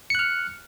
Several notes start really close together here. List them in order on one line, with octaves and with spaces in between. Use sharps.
C#7 F#6 F6